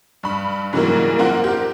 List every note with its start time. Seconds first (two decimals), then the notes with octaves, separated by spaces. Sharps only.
0.23 G2 B5
0.73 G#2 C#3 E3 F#3 G3 A#3
1.18 A#3 C4 F4 A#4 F#5
1.44 G4 A#4